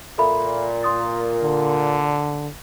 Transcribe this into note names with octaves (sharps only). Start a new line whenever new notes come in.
A#2 A4 E5 B5
C6 D#6 A6
D3